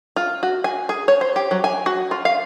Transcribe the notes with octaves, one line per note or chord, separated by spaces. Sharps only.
F4
F#4
G#5
G#4
C#5
C5
G4
F#3
G#5
F#4
F4
F5